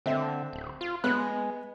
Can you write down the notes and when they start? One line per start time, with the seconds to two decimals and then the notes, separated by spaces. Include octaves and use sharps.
0.06 D3 C4 E5
0.53 D1
0.81 F4
1.04 G#3 B3 B5 F#6